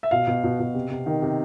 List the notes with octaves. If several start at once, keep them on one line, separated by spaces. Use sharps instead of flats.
E5
B2 F5
B2
B2
B2
C3
C3
D#3
C3